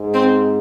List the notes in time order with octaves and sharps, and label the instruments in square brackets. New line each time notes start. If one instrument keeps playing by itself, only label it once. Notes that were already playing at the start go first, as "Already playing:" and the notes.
Already playing: [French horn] G#2
[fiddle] C4